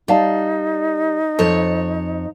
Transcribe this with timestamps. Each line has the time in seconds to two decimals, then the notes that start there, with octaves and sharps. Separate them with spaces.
0.08 G3 D#4 D5 F5 A5
1.39 F2 A4 C5 C#5 A5